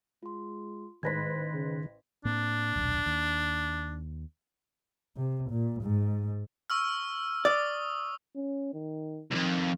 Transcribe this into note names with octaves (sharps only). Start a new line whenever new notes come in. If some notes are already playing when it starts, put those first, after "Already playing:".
G#3 F4 C6
A1 G#2 D#3 B4 C5 G#6 A#6 B6
C#3
A2 A#3 C4 D4
D#1 B1
D#2
C3
A#2
G#2
C#6 E6 F6
D5 D#6
C#4
D#3
C2 F2 D#3